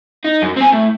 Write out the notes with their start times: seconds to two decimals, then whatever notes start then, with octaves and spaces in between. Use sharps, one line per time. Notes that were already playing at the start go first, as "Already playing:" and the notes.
0.25 D#4
0.42 F#2
0.56 C4 G#5
0.72 A2 A3